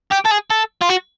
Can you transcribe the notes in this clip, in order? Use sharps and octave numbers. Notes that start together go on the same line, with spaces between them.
G4
A4
G#4
A4
F4
F#4